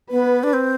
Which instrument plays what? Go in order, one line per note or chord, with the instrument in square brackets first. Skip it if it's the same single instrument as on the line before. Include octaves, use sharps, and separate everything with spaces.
[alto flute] B3 [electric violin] B4
[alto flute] D4
C4